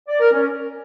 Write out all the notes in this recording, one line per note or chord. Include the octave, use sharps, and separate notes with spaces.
D5
A#4
C#4